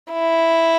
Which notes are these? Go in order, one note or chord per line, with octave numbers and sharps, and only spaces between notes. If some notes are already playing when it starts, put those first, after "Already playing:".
E4